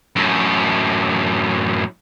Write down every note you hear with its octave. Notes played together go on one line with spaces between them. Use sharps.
F#2 A2